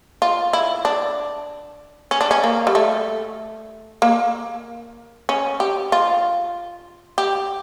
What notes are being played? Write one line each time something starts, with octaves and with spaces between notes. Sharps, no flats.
F4
E4
D4
C#4
D4
C#4
A#3
G3
A3
A#3
C#4
G4
F4
G4